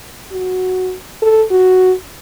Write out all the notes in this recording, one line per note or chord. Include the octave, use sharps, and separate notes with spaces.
F#4
A4
F#4